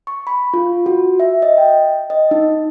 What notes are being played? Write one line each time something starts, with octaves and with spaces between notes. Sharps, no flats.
C#6
B5
F4
F#4
E5
D#5
G5
D#5
D#4